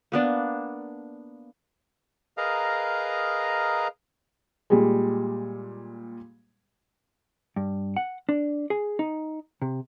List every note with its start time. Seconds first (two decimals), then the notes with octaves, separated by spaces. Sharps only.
0.12 A#3 B3 D4
2.37 G#4 A#4 B4 D#5 F5 A#5
4.70 A#2 G3 G#3
7.56 G2
7.96 F#5
8.29 D4
8.70 G#4
8.99 D#4
9.62 C3